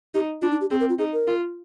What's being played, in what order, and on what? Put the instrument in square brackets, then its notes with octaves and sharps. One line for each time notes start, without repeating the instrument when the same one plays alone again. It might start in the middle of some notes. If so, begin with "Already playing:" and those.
[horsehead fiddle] D#4 [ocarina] G4
[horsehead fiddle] D4 [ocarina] F4
[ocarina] D#4
G4
[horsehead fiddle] C4 [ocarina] G#4
[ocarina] A#4
F4
[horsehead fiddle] D#4 [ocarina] G#4
[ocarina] A#4
[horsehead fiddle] F4